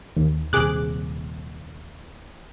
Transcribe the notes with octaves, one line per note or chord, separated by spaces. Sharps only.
D#2
D#1 C3 G#4 D6 F#6